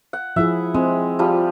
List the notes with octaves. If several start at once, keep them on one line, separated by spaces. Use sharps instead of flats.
F#5
F3 E4 G#4 E5
G#3 C4
F3 G3 G4